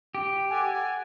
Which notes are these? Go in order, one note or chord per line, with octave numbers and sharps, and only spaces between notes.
G4
A4 F#5 G#5